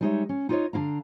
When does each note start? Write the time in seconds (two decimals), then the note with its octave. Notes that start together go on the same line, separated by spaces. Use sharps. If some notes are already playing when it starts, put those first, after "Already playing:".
0.01 G3 G#3 D#4 C5 C#5 E5
0.29 C#4
0.49 D#4 F4 G4 C5 C#5 D#5
0.73 D3 D4 E4 F5 A#5